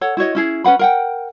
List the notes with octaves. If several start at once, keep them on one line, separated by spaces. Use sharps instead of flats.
A4 C#5 F#5
E4 F#4 C#5 D#5
C#4 E4 G#4
C#4 B4 F#5 B5
A#4 F#5 G5